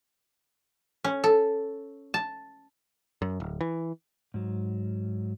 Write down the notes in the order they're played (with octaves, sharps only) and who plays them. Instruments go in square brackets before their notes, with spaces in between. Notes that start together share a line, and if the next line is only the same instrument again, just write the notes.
[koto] C#4
A4
A5
[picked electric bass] F#2
D1
E3
[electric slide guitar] G#2 F#3